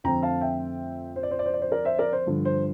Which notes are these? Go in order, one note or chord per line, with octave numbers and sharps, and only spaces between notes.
F2 D3 A3 C4 G5 A#5
F5 A5
E5 G5
C5
D5
C5
D5
C5
D5
C5
A#4 D5
C5 E5
A#4 D5
C5
G2 D3 F3
C5